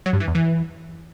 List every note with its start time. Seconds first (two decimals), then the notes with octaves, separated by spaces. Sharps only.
0.06 F#3
0.13 G2
0.20 E3
0.28 E2
0.35 E3